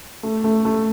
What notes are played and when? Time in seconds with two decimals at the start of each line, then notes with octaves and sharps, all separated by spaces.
0.23 A3
0.44 A3
0.65 A3